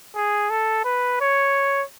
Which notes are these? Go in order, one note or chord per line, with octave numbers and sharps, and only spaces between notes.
G#4
A4
B4
C#5